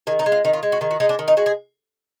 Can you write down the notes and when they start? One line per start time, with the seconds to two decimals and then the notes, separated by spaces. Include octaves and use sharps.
0.07 D#3 G#4
0.19 D#4
0.26 G#3
0.32 F4
0.45 D#3 D#4
0.53 F4
0.63 G#3
0.72 F#4
0.81 D#3 G#4
0.91 F#4
1.00 G#3 D#4
1.09 D4
1.19 D#3
1.28 D#4
1.37 G#3 F#4
1.46 G#4